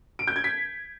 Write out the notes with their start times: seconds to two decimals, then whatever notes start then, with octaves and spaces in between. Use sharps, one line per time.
0.19 D7
0.27 G6
0.36 G#6
0.44 B6